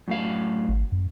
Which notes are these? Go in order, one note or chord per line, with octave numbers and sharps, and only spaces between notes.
F#2 A2 F5
G#1
F#2